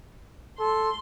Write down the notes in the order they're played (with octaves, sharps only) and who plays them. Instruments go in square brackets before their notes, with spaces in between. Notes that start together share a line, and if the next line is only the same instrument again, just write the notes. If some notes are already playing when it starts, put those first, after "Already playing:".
[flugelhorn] A4 [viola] C6